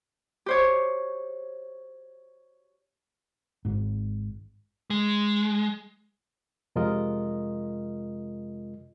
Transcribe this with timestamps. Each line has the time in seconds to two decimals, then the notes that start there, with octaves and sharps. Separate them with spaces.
0.46 G4 C5 C#5
3.65 G#1 G#2
4.90 G#3
6.76 F2 C3 G#3 F4 A#4 D#5